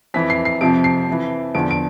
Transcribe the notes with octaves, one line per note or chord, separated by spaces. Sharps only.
F2 E3 B6
C7
C7
F2 C3 F3 D7
C7
F2 E3
E2 D3 F3 D7
D7